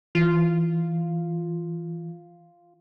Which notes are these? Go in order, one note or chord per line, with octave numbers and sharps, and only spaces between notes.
E3 F4